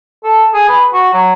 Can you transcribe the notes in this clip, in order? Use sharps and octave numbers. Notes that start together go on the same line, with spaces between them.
A4
G#4
B4
F#4
F#3